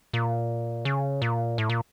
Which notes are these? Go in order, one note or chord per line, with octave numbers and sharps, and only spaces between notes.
A#2
C#3
A#2
A2
A#2